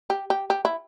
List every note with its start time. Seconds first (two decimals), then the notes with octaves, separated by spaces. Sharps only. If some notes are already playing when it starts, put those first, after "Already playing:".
0.10 G4
0.30 G4
0.50 G4
0.65 E4